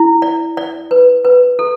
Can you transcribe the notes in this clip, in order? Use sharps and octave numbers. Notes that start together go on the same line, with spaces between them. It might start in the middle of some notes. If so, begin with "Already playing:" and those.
Already playing: E4
D5
D5
B4
B4
A4